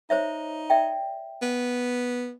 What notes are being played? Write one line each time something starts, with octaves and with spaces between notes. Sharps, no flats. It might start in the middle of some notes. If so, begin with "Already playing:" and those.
D#4 C5 C#5 E5
D5 E5 G5
B3